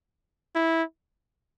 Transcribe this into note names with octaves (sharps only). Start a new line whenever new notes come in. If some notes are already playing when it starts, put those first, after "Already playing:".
E4